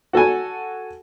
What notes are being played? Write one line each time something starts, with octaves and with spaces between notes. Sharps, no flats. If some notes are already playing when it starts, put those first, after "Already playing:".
F#4 A4 F#5 G#5